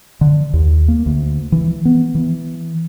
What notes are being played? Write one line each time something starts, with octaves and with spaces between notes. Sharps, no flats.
D3
D#2
A#3
D2
E3
B3
E3